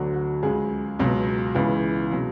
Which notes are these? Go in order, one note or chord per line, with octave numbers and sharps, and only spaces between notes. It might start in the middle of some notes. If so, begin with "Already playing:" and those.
Already playing: D2 D3 F#3 F#4
F#4
C#2 C#3 F#3 G#3 G#4
C#2 B2 F#3
C#2 C#3 E3
B2 F#3